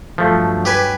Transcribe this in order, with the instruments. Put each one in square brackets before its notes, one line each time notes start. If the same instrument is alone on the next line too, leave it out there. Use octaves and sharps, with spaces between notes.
[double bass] G2 F#3 [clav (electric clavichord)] F3 A3
[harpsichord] G4 B4 G#5